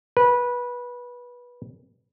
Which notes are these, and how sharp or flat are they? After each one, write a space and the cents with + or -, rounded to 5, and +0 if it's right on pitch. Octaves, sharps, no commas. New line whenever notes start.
B4 -20